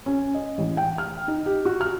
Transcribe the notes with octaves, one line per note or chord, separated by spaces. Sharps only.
C#4
D#5
A1
G5
F6
D#4
G4
F#4
F6